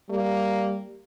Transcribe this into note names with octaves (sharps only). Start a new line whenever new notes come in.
G3 A#3